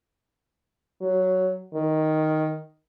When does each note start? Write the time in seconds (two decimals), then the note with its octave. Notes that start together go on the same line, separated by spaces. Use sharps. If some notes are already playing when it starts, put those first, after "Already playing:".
1.02 F#3
1.74 D#3